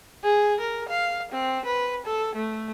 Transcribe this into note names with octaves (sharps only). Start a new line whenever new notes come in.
G#4
A#4
F5
C4
B4
A4
A3